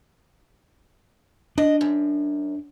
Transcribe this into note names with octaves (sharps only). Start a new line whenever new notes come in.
D4 D#5
F#2